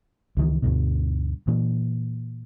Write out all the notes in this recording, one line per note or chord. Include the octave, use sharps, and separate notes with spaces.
C#2 D#3 E3
D2 G2 B2
A#2 E3